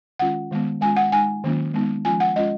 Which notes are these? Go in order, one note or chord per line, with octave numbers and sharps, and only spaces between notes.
D#3 G#3 C#4 F4 F#5
D#3 G#3 B3
G#3 C#4 F4 G#5
F#5
G#3 D#4 G#5
D#3 F#3 A#3 C#4 F4
G#3 B3 D#4
F3 G#3 C#4 F4 G#5
F#5
G#3 C#4 F4 D#5